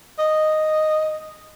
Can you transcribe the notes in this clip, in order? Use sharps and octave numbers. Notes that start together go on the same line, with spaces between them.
D#5